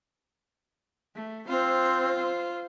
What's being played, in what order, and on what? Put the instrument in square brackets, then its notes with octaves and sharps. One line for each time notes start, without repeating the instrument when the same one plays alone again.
[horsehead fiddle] A3
[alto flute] C4 [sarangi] F4 [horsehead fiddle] C5